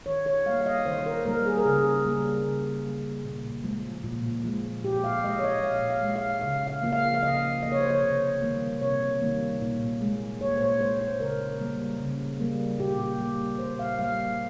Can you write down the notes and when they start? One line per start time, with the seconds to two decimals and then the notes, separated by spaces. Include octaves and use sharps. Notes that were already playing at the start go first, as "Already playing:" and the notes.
0.06 D#3 C#5
0.26 C#5
0.46 G3 A#3 F5
0.61 F5
0.66 D#5
0.86 D#3 C5
0.99 C5
1.06 A#4
1.25 G3 A#3 A#4
1.46 G#4
1.58 A#4
1.66 C#3 G#4
2.06 G3 A#3
2.45 C#3
2.86 G3 A#3
3.25 A#2
3.64 F3 G#3
4.04 A#2
4.44 F3 G#3
4.84 A#2 G4
5.04 F5
5.24 G#3 D#5
5.39 C#5
5.44 D#5
5.63 A#2 F5
5.90 F5
6.03 G#3
6.16 F5
6.41 C#3 F5
6.67 F5
6.83 F3 A#3
6.93 F5
7.14 F5
7.23 C#3 D#5
7.63 F3 A#3 D#5
7.72 C#5
7.81 C5
7.91 C#5
8.02 C3
8.42 D#3 G3 A#3
8.82 C3 C#5
9.22 D#3 G3 A#3
9.62 A#2
10.01 G#3
10.41 A#2 C#5
10.57 C5
10.61 C#5
10.81 G#3 C5
11.01 C5
11.20 C#3 A#4
11.60 G3 A#3
12.00 C#3
12.40 G3 A#3
12.80 A#2 G4
12.99 G4
13.20 G3 A#3
13.59 A#2 C5
13.79 F5
13.99 G3 A#3 F5